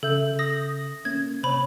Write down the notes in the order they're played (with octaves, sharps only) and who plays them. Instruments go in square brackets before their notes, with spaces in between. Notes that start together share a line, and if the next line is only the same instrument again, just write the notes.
[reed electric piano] C#3 E5 [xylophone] A4 G6
[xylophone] D#6 A#6
[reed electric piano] A#3 C#4 [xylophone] G#6
[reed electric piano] C3 C#5 [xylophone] C5 B5